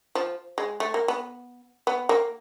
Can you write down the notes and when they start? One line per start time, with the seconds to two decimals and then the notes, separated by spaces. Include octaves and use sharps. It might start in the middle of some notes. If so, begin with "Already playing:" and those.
0.15 F3
0.58 G#3
0.80 A3
0.94 A#3
1.08 B3
1.87 B3
2.09 A#3